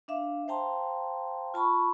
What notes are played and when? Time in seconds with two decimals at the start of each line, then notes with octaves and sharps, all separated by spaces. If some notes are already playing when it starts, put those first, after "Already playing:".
0.08 D4 E5 F5 D6
0.48 C5 F5 G5 A5 A#5 C6
1.54 F4 A5 B5 C#6